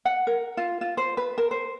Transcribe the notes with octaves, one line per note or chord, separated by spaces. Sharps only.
F#5
A#4
F4
F4
C5
B4
A#4
C5